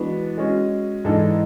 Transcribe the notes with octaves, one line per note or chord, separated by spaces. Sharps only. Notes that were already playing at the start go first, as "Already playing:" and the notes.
Already playing: E3 G#3 B3 D4 F#4
G#3 C#4 F#4
G#2 E3 G#3 D4 A4